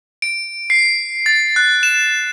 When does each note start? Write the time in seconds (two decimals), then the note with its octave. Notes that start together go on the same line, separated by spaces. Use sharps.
0.22 D7
0.70 C7
1.26 A6
1.56 F#6
1.83 E7